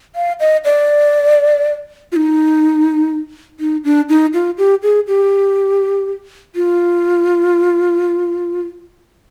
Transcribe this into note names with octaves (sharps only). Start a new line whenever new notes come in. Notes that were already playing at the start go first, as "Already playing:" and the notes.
F5
D#5
D5
F4
D#4
D#4
D4
D#4
F4
G4
G#4
G4
F4